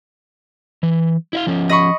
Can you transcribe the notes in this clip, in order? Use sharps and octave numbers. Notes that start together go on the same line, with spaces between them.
E3
E4 E5 F5
F3 C#4
D#5 B5 C#6